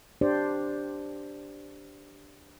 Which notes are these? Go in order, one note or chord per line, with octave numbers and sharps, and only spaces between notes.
D4 G4 C5 D5